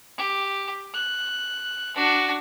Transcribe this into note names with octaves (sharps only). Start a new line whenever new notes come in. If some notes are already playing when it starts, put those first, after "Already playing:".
G4
F#6
D4 F#4